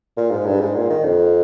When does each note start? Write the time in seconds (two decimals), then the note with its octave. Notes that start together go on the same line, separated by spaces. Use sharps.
0.17 A#2
0.31 G#2
0.46 G2
0.61 G#2
0.76 A#2
0.90 D#3
1.05 F2